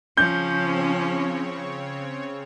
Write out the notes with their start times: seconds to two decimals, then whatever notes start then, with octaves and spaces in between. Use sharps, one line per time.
0.17 C#3 F3 C4 C#4 C#5 G6